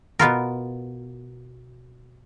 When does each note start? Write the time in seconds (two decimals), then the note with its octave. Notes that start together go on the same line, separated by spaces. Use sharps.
0.19 B2 B3 F4 A#4